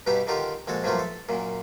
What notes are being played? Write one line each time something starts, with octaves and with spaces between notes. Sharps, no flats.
G2 B2 B3 D#4 G4
D3 D#3 D#4 F4 G4
A#1 G#3 F#4 A4
G2 F3 F#3 A3 A#3 F4
A4
F#2 A#2